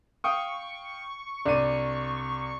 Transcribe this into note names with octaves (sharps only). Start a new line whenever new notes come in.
F5 G5 C#6 D#6
C2 D4 D#7